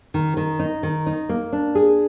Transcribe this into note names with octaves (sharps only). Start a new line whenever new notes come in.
D#3
D#3
D#4
D#3
D#4
A#3
D4
G#4